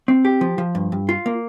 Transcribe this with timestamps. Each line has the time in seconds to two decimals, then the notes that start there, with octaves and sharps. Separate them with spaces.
0.08 C4
0.25 G4
0.41 F3
0.58 F3
0.75 G2
0.92 G2
1.09 F4
1.26 A#3